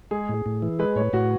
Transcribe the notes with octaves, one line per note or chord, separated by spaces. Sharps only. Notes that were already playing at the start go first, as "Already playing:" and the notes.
G#3 G#4
A2
A2
E3
G#3 B4
A2 C#5
A2 F#4